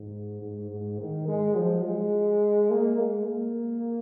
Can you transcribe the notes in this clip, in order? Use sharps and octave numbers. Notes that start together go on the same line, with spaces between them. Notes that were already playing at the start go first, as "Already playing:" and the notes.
Already playing: G#2
G#2
G#2
D#3
G#3
F3
G#3
A#3
G#3
A#3